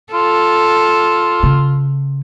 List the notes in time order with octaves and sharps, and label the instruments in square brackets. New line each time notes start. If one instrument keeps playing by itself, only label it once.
[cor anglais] F4 [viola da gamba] A4
[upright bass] C#3